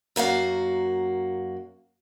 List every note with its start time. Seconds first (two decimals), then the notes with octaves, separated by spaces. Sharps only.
0.16 F#2 A#3 F#4 F5